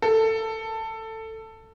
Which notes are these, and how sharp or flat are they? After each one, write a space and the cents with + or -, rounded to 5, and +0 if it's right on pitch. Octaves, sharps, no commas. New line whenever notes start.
A4 +15